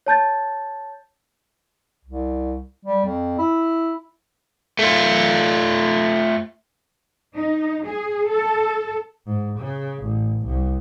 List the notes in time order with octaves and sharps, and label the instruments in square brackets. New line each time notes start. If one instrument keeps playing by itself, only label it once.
[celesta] C#5 A5 G6 A6
[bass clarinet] C2
G3
F2
E4
[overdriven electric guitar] A3 F4
[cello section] D#4
G#4
A4
[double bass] G#2
C#3
A1
C2